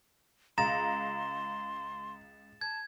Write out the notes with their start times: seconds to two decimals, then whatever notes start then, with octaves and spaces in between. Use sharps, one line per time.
0.58 C#2 A#5 C6 A6 E7
2.61 A5 G#6